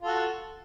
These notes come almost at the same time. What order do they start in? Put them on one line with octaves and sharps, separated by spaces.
F4 A4 F#4